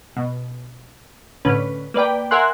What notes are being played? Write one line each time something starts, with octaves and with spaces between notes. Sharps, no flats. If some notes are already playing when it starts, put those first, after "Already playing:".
B2
A2 D3 C#4 B4
A#3 B4 D5 G5
A#4 E5 F#5 G#5 C6 F#6